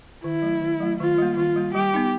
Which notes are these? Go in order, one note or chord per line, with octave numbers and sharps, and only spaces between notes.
D#3 E4
F#3 A3
D#3
F#3 A3
D#3 F4
G3 A#3
D#3 F4
G3 A#3
G3 G4
B3 D#4